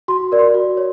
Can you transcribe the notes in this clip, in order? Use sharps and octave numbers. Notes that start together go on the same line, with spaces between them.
F#4 C6
A#4 D5
C6
F#4
C#5